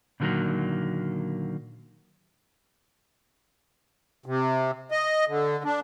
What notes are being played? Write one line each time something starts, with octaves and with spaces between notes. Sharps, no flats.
A#2 D3 D#3 F#3 A#3
C3
D#5
D3
D4